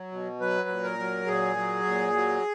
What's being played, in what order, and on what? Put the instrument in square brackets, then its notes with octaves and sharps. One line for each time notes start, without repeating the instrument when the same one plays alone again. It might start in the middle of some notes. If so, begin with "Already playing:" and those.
Already playing: [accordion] F#3
B2
F#3 B4
A#2
A#4
F#3
A#2 G#4
F#3
A#2
F#3